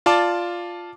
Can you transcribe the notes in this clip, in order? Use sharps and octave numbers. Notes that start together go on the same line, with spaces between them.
F4 D5 A5 D6